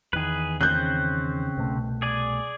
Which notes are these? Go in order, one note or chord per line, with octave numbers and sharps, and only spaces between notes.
E2 D#3 G#4 B4
C#3 C4 F#6 G6
C2 B2 A3
G#4 D5 G#5